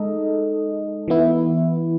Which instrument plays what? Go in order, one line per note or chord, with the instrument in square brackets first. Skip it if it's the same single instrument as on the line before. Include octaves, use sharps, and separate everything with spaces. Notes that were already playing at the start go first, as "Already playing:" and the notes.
Already playing: [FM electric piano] G#3 D#4 A4 D#5
E3 B3 E4